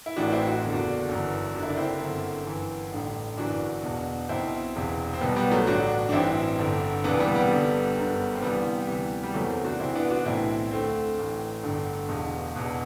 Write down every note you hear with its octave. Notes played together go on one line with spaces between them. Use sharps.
E4
A1 A2 E3 D4 F#4
C4 E4
F#4
F#1 E2 D3
D4 F#4
G1 F#2 E3
F#1 F#2 D3 F#4
E4
D4
C4 E4
G1 F#2 D3
G1 F#2 E3
A1 G2 D3
G1 F#2 E3 D4 F#4
E1 E2 B2
B1 B2 C4 E4
E1 E2 C3
C4
B1 B2 G3 B3
G3 B3
F#3 A3
A1 G2 D3 D4 F#4
D4
A1 G2 E3 C4 E4
G1 G2 D3
E1 E2 C3 E3 B3 D4
G3 B3
G3 B3
G1 G2 D3
G1 F#2 D3
C4
C2 C3 E3 G3 B3
D2 C3 E3
G3
F#1 E2 C3 E3 F#3 A3
A3 C4
D4 F#4
C2 C3 E3 C4 E4
B3 D4
D4 F#4
B1 A2 E3 C4 E4
D2 D3 A3 C4
A1 A2 E3
G1 G2 D3
E1 E2 B2
E1 E2 B2